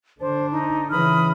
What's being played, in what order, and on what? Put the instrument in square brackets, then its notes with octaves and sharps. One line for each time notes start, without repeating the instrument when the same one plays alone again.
[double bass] D3 D4 [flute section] C5
[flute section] D#4
[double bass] C#3 E3 [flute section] B5 D#6 F6